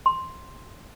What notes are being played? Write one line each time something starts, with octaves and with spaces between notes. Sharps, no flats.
C6